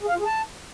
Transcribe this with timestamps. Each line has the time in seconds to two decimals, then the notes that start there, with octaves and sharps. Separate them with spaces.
0.03 G#4
0.08 F5
0.14 F4
0.20 G#4
0.25 A5